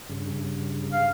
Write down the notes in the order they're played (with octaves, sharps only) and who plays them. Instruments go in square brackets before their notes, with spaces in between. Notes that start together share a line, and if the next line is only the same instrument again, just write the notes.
[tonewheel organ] G2 C#3
[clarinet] F5